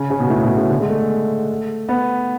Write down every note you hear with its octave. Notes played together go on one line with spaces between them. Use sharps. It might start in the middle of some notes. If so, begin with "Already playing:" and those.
Already playing: C#3
C#3
B2
A2
B2
C#3
D3
G#3
A3
B3